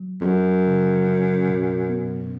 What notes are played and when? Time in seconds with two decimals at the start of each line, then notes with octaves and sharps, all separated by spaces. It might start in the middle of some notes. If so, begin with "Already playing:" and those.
Already playing: F#3
0.21 F2
0.25 F#2 F#3
0.66 C#3
1.07 C#4
1.48 B2
1.89 B3